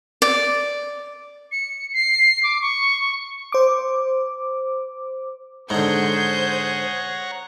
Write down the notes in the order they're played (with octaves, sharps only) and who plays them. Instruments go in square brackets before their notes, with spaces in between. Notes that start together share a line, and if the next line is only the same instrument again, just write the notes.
[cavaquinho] D5
[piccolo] C#7
C7
D6
C#6
[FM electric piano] C5 D6
[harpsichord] G#2 D3 [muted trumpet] G#4 [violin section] C5 G6 [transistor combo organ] C#5 F#5 A#5